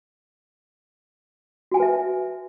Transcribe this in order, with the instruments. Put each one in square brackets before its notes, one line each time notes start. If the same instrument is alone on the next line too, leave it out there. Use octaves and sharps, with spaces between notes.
[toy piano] F#4
G#5
A5
B4
E5